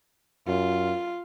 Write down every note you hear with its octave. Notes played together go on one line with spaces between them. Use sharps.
F#2 F4